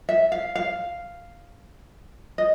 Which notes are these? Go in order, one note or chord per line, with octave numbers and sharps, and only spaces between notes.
E5
F5
F5
D#5